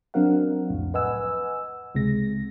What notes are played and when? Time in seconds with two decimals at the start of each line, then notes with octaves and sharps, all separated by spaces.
0.14 F#3 C4 D4 A#4 F5 F#5
0.70 C2 F2 A2
0.94 B4 D#5 F#5 G#5 E6
1.95 C#2 C3 G#3 A#6